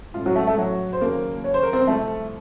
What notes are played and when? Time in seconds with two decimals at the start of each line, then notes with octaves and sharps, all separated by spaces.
0.14 A1 A2 A3 F4
0.26 F#3 F#4
0.36 A3 A4
0.47 A3 A4
0.58 F#3 F#4
0.93 C5
1.01 D#2 C#3 F#3 A#3 A#4
1.44 C#5
1.54 C5
1.63 A#4
1.73 C4 C5
1.87 C2 C3 F3 A3 A4